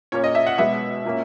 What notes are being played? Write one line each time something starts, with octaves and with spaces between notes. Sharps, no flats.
A#2 A#3 C#4 C#5
D#5
E5
F#5
B2 G#3 B3 E5
A#2 A#3 C#4